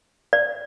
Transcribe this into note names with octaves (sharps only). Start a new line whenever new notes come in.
D5